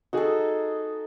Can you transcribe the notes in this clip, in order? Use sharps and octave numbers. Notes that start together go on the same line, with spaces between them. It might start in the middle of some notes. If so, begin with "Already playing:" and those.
D#4 F#4 G#4 A4